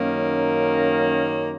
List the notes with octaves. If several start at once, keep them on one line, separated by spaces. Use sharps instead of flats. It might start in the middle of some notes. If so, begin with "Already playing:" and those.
Already playing: F#2 D#3 A#3 C#4
A#4